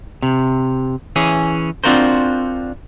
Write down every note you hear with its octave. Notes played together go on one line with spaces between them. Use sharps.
C3
E3 C#4 G#4
C4 D4 F4 F#4 A#4 C5